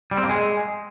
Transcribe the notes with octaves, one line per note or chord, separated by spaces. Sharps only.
G3
C4
A#3
G#3